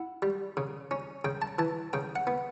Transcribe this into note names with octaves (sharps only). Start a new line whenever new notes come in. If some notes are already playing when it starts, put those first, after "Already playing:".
Already playing: E4 F#5
G3
C#3
C#4
C#3 G5
A5
E3 A5
C#3 G5
F#5
B3